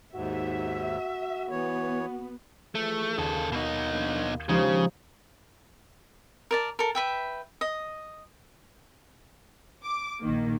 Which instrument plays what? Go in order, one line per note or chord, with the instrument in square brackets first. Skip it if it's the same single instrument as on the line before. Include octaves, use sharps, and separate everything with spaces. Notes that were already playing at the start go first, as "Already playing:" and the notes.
[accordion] D#2 G#2 [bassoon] F#4 [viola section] E5
[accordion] E3 C#5 [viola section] B3
[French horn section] E3 F3 G#4 [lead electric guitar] A3
[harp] D#2 [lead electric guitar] C#3 A4
[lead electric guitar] B2 D#4
[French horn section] F3 A#3 D4
[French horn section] D#2 G4 [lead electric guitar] C#3 [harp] F3 G#3 D#4
[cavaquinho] A#4 D5 A5
A4 A#4
B4 E5 G5
D#5
[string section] D6
A#1 D#3 A#3